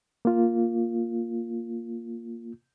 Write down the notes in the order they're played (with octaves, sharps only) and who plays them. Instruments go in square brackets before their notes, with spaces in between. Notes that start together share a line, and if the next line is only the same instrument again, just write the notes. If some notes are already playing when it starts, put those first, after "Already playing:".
[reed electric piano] A#3 F4